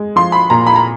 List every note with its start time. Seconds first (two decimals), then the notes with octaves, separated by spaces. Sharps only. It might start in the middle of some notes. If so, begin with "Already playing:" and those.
Already playing: G#3
0.16 F3 C6
0.32 B5
0.50 A#2 A#5
0.67 B5
0.76 A#5